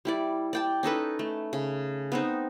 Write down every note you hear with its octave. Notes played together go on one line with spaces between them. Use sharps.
G3 E4 D5
D5 G5 A5
C#4 D#4 A4 B4
A3
C#3
B3 C4 D#4